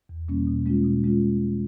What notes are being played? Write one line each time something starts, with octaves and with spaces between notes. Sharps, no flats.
E2
B2 G3 A#3 C#4
B2
G#3 C#4 F4
B2
G#3 C#4 F4